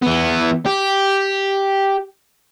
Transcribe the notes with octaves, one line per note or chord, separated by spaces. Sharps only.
E3 B3
G4